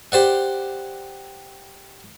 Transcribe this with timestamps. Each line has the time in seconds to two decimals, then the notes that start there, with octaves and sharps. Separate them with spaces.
0.12 G4 C5 D5 F#5